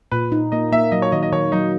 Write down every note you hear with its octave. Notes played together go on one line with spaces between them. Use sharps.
A#2 B4
D#4
A#3 D#5
A#3 E5
F#3 D#5
C#5
D#3 D#5
D#5
D#3 C#5
F#3 D#4